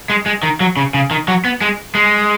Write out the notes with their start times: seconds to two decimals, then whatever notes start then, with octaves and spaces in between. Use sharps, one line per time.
0.10 G#3
0.26 G#3
0.43 D#3
0.60 F#3
0.77 C#3
0.94 C#3
1.11 D#3
1.28 F#3
1.45 B3
1.62 G#3
1.95 G#3